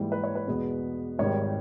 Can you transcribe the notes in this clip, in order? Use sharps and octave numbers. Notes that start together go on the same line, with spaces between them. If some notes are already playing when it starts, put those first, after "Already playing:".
Already playing: G#2 E3 G3 A#3
B4
C#5
B4
E2 B2 G#3 B3
G#1 G#2 D#3 G3 C#5